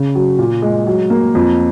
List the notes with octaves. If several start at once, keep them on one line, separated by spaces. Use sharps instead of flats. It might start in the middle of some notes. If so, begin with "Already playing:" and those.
Already playing: C#3
F#3
A#2
G#3
F#3
A#3
F2